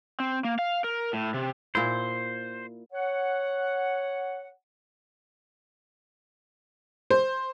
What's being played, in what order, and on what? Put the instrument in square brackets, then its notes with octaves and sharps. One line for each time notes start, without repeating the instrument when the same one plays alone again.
[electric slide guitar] C4
A#3
F5
A#4
A2
C3
[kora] A#2 E4 [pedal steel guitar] C5
[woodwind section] C#5 F#5
[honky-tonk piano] C5